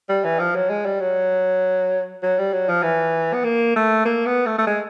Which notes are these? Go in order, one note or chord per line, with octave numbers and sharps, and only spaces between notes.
G3
E3
F3
F#3
G#3
G3
F#3
F#3
G3
F#3
F3
E3
B3
A#3
A3
A#3
B3
A3
A3
G#3